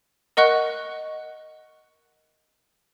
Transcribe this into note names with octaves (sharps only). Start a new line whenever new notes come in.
A#4 D#5 F#5 C#6 F#6